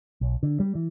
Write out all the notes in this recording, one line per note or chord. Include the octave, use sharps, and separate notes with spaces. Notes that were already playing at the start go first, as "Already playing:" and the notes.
B1
D3
G3
E3